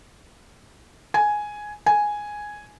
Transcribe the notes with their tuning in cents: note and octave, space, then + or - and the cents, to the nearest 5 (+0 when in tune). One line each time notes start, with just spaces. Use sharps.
G#5 +5
G#5 +0